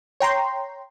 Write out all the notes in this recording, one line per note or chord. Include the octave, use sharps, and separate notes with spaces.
C#5 G5 A#5 C6